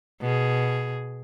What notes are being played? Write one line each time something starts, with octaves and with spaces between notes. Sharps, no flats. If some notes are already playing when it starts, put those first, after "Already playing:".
B2 G#4